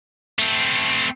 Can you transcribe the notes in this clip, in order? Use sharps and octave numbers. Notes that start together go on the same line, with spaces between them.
A3 C4